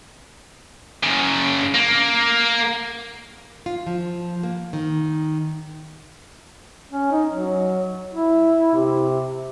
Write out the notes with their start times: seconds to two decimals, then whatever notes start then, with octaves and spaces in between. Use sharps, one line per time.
1.03 F#2 C#3
1.75 A#3
3.66 F4
3.87 F3
4.43 A#3
4.73 D#3
6.91 C#4
7.12 D#4
7.31 F#3
8.14 E4
8.75 C3